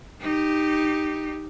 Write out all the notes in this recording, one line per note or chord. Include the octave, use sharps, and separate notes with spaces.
D#4 G4